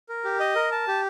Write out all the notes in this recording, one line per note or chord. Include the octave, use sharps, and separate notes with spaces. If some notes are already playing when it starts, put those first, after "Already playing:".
A#4
G4
D#5
A#4
A5
G4